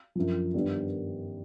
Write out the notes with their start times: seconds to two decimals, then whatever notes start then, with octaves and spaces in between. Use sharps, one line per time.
0.15 F#2 D3 F3
0.54 G2 D#3 G3 B3 D4